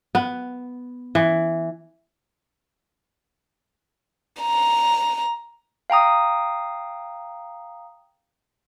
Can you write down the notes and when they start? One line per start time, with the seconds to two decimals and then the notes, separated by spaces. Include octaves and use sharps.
0.15 B3
1.15 E3
4.42 A#5
5.90 F5 G5 A#5 D#6